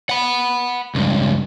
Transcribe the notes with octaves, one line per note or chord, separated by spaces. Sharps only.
F#5 B5
C#2 G2